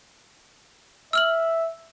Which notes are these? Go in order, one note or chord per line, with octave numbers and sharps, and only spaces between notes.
E5 E6 F6 F#7